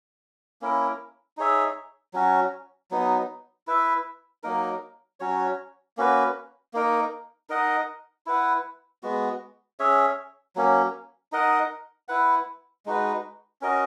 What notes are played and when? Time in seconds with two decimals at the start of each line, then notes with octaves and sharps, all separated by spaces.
0.61 A#3 C#4 E4 A#4
1.37 D#4 G#4 C#5 E5
2.13 F#3 C#4 F#4
2.91 F#3 B3 D#4
3.67 E4 B4 E5
4.43 F#3 A#3 D#4 A#4
5.20 F#3 C#4 F#4 C#5
5.97 A#3 C#4 F#4 B4
6.73 A#3 D#4 A#4
7.49 D#4 A#4 D#5 F#5
8.26 E4 B4 F#5
9.03 G#3 B3 F#4
9.79 C#4 G#4 C#5 E5
10.56 F#3 A#3 C#4
11.32 D#4 A#4 D#5 F#5
12.08 E4 B4 F#5
12.86 G#3 D#4 F#4 B4
13.61 C#4 F#4 A#4 D#5